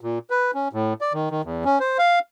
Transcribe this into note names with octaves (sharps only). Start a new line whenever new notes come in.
A#2
B4
C#4
A2
D5
D#3
D#3
E2
C#4
C5
F5